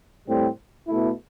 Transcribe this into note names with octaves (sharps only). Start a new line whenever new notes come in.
A2 G3 C4
B2 A3 E4